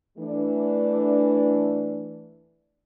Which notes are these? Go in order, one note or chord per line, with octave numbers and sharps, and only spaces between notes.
E3 A3 D4